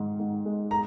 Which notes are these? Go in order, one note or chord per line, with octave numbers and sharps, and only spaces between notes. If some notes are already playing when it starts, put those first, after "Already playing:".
Already playing: G#2 D#3
G#2
G#3
A#5